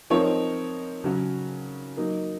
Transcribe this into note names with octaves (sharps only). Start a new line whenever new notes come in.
F3 C4 D#4 A#4 C#5
C#3 F#3 C#4 F#4
F#3 A#3 D#4